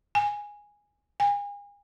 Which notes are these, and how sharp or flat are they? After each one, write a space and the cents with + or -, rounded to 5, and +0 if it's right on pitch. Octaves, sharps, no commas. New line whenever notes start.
G#5 -10
G#5 -35